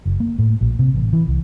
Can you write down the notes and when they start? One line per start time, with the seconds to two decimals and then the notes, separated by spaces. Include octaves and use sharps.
0.05 F#1
0.20 A#3
0.39 A2
0.61 A#1
0.79 C3
0.94 A1
1.13 E3
1.27 C2